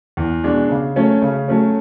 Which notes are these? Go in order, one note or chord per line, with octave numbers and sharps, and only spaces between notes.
E2
B2 G#3 D4
C#3
F#3 A3 C#4
C#3
F#3 A3 C#4